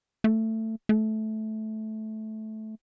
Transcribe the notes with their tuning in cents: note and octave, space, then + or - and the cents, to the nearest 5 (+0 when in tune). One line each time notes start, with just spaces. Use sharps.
A3 +15
A3 -15